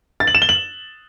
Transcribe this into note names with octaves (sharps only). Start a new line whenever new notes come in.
A6
F#7
E7
G7
F#7